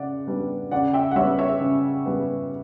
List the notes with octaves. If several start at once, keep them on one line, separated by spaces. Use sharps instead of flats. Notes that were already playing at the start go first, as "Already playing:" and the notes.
Already playing: C#3 D5 F#5
G3 B3 D4
C#3 D5 F#5
E5 G5
F#5
G3 B3 C#5 E5
C#5 E5
C#3
G3 B3